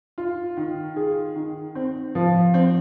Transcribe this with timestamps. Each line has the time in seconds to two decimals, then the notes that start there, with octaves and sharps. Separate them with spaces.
0.18 F4
0.57 D#3
0.96 G#4
1.36 D#3
1.75 C4
2.15 F3
2.54 C4